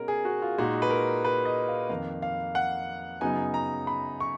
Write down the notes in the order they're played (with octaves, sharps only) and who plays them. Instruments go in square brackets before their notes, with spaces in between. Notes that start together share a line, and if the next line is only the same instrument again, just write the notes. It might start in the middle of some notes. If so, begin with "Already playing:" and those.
Already playing: [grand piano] B2 G#3 C#4 A#4
G#4
F#4
F4
A#2 G#3 D#4 F#4
B4
A#4
B4
D#5
F5
F2 D#3 A#3 F5
F5
F#5
F#2 C#3 F#3 B3 D#4 G#5
A#5
B5
C#6